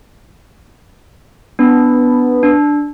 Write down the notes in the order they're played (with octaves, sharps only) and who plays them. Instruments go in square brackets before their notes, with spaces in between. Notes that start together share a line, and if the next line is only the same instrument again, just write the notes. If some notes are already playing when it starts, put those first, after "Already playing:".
[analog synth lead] B3 [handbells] D4
[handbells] D4